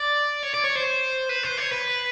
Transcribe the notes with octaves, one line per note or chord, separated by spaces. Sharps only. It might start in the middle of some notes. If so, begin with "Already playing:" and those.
Already playing: D5
C#5
D5
C#5
C5
B4
C5
C#5
B4